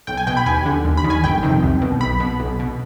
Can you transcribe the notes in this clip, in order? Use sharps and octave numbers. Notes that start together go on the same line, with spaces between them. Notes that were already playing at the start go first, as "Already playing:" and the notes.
B1 G5
G#5
B2 G5
B5
D#2 G#5
D3
D#2
B5
D#3
G#5
G1 G5
F2 C3 D#3
C2
B2
B1 B5
B2
B1
B2